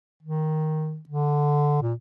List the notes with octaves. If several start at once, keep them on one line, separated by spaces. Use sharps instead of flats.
D#3
D3
A#2